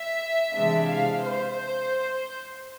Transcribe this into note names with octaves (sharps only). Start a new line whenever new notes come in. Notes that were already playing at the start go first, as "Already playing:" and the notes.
Already playing: E5
C3 E3 G#3 D4 E5
F5
C5